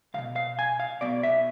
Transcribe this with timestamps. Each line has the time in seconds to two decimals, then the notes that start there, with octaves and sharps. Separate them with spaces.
0.14 B1 B2 F5
0.36 F5
0.59 G#5
0.80 F5
1.01 B1 B2 D5
1.23 E5